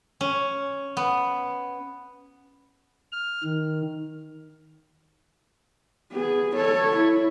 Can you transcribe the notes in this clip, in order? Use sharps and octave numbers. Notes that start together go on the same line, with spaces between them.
C#4
B3
F6
D#3
B3 G#4
A4 C#5
E4